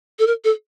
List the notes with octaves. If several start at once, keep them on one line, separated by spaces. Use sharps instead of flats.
A4
A#4
A4